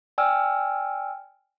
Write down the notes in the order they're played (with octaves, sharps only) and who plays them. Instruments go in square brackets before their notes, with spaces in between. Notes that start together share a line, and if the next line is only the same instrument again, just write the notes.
[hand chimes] D5 G5 G#5 E6 F6